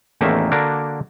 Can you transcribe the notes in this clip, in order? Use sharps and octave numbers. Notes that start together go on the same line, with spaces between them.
A1 E2 D#3 A3 A#3 E5
D3 A#3 D4 F#4 A#4